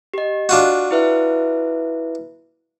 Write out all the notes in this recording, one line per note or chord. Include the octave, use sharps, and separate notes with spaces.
G4 D#5
D4 F4 F#4
E4 B4 E5